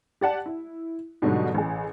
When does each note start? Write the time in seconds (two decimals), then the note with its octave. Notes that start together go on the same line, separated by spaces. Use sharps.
0.21 G4 D5 F#5 A5
0.46 E4
1.22 G#2 B2 D3 F#3 G3
1.54 A1 G#4